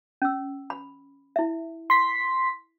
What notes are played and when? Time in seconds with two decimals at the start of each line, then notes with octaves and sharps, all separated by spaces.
0.22 C#4 E6
0.70 B5
1.36 E4 E5
1.90 C6 B6